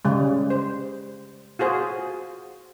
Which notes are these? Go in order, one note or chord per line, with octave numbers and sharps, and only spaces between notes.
C#3 G3 G#3
C5
F4 F#4 G#4 C5